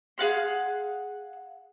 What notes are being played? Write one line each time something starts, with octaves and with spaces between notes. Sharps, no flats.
G#4 F5 F#5 C6